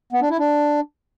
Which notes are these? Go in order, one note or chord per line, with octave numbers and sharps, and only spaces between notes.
B3
D4
E4
D4